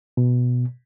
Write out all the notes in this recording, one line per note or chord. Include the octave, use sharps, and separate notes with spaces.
B2